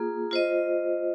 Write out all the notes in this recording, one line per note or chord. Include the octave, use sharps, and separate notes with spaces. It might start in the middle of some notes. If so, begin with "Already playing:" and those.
Already playing: A#3 F4 G#4
F4 C5 D#5